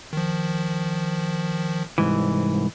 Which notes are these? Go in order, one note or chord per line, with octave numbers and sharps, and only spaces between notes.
D#3 F3
C2 G#2 E3